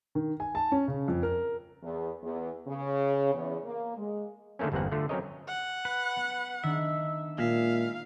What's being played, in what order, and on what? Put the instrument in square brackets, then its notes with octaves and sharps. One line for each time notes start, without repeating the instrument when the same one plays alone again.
[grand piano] D#3
G#5
A5
C#4
C#3
F2
A#4
[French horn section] E2
E2
C#3
E2
A#3
G#3
[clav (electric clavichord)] D3 D#3 A3 A#3 C#4
G1 E2 G2 A#3 C4 F#5
D3 A3 F4
F#3 C4 C#4 A#4 C#5 D#5
[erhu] F#5
[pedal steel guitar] B4
[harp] B3
[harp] D#3 D4 [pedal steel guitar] E5
[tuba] A#2 [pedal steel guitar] G#3 E5 [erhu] F5